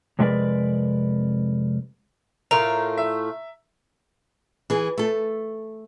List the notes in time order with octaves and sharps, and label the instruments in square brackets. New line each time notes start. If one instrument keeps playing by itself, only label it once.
[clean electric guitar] F2 C3 G#3 A#4 B4 D5
[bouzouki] A2 A3 F4 [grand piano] A#4 [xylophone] A#5
[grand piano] E5
[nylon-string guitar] E3 G#4
A3 A4